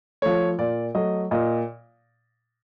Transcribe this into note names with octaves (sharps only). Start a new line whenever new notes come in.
F3 A3 C#5
A#2 D5
F#3 A3 D#5
A#2 D#5